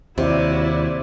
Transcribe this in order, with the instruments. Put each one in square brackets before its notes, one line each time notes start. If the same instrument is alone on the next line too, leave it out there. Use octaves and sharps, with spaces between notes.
[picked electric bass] D#2 [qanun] C3 [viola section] E4 F#4 D5